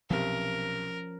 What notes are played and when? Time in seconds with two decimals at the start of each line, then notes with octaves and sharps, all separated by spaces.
0.10 B1 C3 F3 C#4 A#4